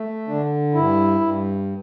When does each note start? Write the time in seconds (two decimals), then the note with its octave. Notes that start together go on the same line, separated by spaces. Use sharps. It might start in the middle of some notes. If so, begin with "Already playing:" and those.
Already playing: A3
0.28 D3 D4
0.74 G2 E4
1.21 G2